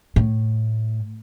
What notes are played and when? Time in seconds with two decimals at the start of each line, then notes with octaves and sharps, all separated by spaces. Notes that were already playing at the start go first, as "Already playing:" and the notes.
0.16 A2